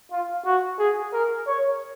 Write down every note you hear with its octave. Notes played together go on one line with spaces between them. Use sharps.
F4
F#4
G#4
A#4
C#5